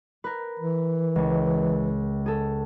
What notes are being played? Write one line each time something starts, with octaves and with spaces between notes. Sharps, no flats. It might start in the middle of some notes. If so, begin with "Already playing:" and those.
A#4 B4
E3
C#2
G#4 A4